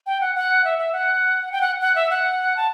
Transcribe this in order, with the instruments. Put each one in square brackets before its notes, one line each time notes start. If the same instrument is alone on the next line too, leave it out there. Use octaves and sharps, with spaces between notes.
[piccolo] G5
F#5
F#5
E5
E5
F#5
G5
F#5
F#5
E5
F#5
A5